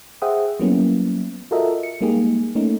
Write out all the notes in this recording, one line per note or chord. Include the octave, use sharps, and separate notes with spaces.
G#4 C5 E5 F#5 G5 D#6
F#3 G3 A#3 B3 C#4 E4
F4 F#4 A4 A#4 D#5 E5
C#7
G3 G#3 A#3 D#4 G4 G#4
A3 A#3 C#4 D#4